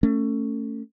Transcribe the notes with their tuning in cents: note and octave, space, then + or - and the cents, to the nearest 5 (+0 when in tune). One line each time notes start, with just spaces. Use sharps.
A3 +20 C#4 +0